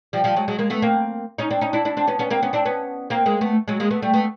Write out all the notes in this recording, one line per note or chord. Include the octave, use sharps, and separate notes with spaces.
F3 G3
F3 G3
F#3 G#3
F#3 G#3
G#3 A#3
A3 B3
A#3 C4
C#4 D#4
C4 D4
C#4 D#4
D4 E4
D4 E4
C4 D4
B3 C#4
B3 C#4
A#3 C4
B3 C#4
C4 D4
B3 C#4
A#3 C4
G#3 A#3
A3 B3
F#3 G#3
G#3 A#3
A3 B3
G3 A3
A3 B3